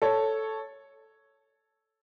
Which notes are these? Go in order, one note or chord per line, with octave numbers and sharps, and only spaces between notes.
A4 C#5